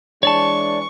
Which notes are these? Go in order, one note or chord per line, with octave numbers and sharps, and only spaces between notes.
E3 G#3 D4 C#5 D5 A5 C#6